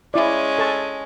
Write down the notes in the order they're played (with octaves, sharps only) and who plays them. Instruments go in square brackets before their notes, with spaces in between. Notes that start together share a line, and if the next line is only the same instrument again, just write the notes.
[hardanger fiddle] G#3 C#4 [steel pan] E4 D5
[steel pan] A4 A5 C#6